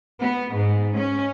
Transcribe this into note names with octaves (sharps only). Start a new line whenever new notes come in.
B3
G#2
C#4